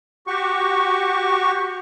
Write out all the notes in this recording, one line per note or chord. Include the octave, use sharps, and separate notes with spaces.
F#4 G4 C#6